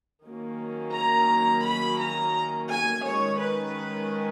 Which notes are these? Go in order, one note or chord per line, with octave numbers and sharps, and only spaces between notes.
D#3 F#3 A#3 C#4
A#5
B5
A#5
G#5
D#3 G#3 C#4 C#5
B4